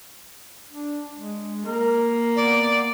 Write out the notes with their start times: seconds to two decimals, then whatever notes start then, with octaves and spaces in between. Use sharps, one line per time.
0.72 D4
1.15 G#3
1.66 A#3 A#4
2.36 B3 D5